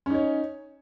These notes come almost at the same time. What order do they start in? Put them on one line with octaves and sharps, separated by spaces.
C#4 D#4 C#5